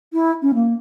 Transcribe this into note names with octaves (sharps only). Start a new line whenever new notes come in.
E4
C#4
A#3